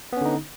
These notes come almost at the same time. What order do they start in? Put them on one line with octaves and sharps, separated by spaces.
B3 C#4 D3 D#4